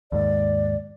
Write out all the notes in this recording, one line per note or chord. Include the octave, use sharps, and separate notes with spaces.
D#2 G#2 D5